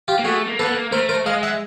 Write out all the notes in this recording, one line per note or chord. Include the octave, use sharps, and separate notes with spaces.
F4 G4
A#3
A3 F#4 G#4
A#3
B3 A4 B4
A#3
A3 A#4 C5
A#4 C5
G#3 D#5 F5
E5 F#5